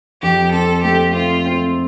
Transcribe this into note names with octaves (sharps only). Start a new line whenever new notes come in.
F2 G4
C4 A4
A3 G4
C4 F4
C4